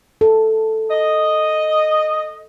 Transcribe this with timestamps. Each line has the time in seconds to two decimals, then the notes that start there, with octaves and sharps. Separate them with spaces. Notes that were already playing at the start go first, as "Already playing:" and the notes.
0.21 A4
0.90 D#5